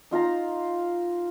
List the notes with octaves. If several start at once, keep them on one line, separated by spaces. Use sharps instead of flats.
D#4 F4 F5 A#5